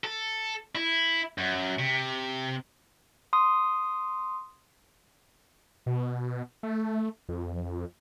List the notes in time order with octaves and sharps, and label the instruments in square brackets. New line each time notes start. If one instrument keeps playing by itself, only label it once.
[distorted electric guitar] A4
E4
F#2
C3
[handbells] C6 D#6
[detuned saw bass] B2
A3
F2